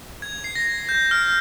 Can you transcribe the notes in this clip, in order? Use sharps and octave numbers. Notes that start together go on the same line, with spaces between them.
G#6
C7
A#6
G6
F6